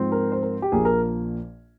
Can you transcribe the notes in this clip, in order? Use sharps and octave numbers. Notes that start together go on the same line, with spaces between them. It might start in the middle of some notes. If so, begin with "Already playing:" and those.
Already playing: G#2 F3 C4
A#4
C5
A#4
G4
A#1 A#2 F3 A#3 G#4
A#4